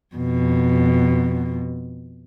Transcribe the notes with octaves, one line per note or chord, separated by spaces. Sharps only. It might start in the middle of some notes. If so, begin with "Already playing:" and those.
F2 B2